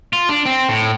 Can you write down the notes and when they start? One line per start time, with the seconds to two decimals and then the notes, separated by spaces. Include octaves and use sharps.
0.13 F4
0.29 D4
0.46 C4
0.69 A2